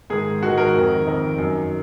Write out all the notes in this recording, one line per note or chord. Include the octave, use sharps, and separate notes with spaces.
G#2 D#3 G#4
G#2 D#3 F#4
A#4
F2 D#3
F2 D#3
F#2 D#3